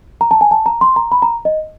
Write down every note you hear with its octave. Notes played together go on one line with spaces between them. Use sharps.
A#5
A5
G#5
A5
A#5
C6
A#5
B5
A#5
D#5